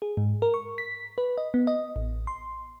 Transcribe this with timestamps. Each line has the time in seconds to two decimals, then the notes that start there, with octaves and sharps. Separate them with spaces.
0.02 G#4
0.17 G#2
0.42 A#4
0.54 C#6
0.78 B6
1.18 B4
1.38 D#5
1.54 B3
1.67 D#5
1.96 A1
2.27 C6